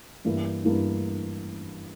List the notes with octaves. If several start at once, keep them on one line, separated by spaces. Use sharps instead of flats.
G2 E3 A#3 E4
G2 E3 A#3 E4